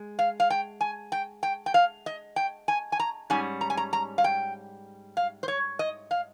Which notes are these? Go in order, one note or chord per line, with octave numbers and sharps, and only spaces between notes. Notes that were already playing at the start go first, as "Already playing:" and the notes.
Already playing: G#3
F5
F5
G5
G#5
G5
G5
G5
F5
D#5
G5
G#5
G#5
A#5
G#2 G3 C#4 G#5
A#5
G#5
A#5
A#5
F5
G5
F5
C5
C#5
D#5
F5